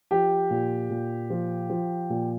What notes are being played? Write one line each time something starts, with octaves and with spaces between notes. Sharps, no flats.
F3 G4
A#2
A#2
F3
F3
A#2